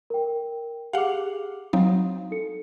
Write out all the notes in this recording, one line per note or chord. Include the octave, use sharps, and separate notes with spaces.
A#4 G5
G4 G#4 F5 F#5 D6
F#3 C4 D#4 F5
D#4 A4 C#7